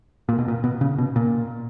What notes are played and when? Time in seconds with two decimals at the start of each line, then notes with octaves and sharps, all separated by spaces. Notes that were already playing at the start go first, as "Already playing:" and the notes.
0.29 A#2
0.39 B2
0.48 A#2
0.64 B2
0.81 C#3
0.98 B2
1.16 A#2